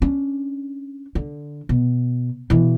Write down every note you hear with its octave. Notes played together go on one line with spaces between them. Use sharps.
C#4 D4
D3
B2
B2 E3